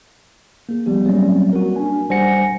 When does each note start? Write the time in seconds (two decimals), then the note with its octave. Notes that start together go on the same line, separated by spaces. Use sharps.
0.69 A#3 G#4
0.86 F3 G3 B3 G4
1.05 F#3 G3 A#3 C4 C#4
1.53 F#4 A#4
1.76 D4 G#5
2.10 G3 C5 F#5 G#5 A#6 C#7